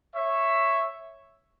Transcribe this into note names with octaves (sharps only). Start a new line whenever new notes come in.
C#5 E5